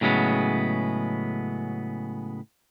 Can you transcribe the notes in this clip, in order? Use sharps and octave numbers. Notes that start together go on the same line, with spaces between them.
A2 C#3 F#3 G#3 B3